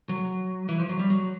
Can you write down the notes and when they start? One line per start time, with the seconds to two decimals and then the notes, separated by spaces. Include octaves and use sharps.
0.09 F#3
0.69 E3
0.80 F3
0.89 F#3
0.99 G3
1.10 F#3